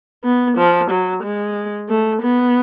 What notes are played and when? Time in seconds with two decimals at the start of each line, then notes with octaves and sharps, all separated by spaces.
0.24 B3
0.58 F3
0.90 F#3
1.23 G#3
1.89 A3
2.22 B3